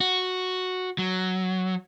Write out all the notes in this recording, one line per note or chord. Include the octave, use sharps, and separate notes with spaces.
F#4
F#3